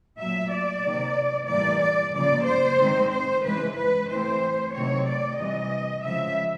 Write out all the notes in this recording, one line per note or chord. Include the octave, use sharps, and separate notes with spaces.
A#2 F#3 A3 E5
D5
C3 D#3 F#3 A#3
A2 E3 G3 A#3 D5
D5
C#3 F3 A#3 D5
C5
D#3 G#3 C4
C5
C#3 E3 G#3 B4
B4
E3 A3 C4 C5
C3 D#3 F#3 A3 C4 C#5
D5
C3 E3 G3 D#5
C#3 F3 G#3 E5